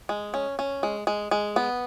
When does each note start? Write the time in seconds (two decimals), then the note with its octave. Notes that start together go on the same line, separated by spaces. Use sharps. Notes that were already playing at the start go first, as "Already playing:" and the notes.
0.09 G#3
0.34 C#4
0.59 C#4
0.83 G#3
1.07 G#3
1.31 G#3
1.56 B3